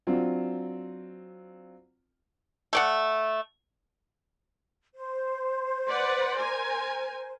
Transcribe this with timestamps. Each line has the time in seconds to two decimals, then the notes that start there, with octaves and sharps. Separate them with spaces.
0.07 F#3 C4 D4 F4
2.73 A3 D5 F#5
4.94 C5
5.89 B4 D5 F#5
6.39 A#4 G#5